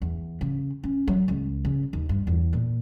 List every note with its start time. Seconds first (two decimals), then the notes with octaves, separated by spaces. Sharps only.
0.02 E2
0.41 C#3
0.83 C#4
1.08 F#3
1.28 C#2
1.65 C#3
1.93 D#2
2.09 G2
2.27 E2
2.53 A#2